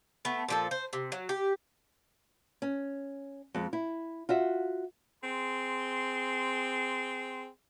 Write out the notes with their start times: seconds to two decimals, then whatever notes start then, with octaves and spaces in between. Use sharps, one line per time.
0.25 A3 B3
0.48 A#2 F3 A4
0.71 C5
0.93 C3
1.12 F#3
1.29 G4
2.62 C#4
3.55 F2 G#3
3.73 E4
4.29 F4 F#4 E5
5.24 C4 G#4 C6